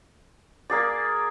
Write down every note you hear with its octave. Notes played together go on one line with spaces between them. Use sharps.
A#3 G#4 D5